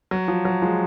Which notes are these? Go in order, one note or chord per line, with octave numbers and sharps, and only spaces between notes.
F#3
F3
F#3
F3 G#3